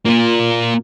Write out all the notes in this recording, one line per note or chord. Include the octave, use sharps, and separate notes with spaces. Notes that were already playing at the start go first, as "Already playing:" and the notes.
A#2 A#3 F4